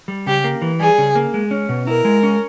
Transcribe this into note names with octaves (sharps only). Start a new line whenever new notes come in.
G3
C#3 G4
A#3
E3
G3 G#4
C#3
A#3
G#3
C#4
B2
E4 A#4
G#3
C#4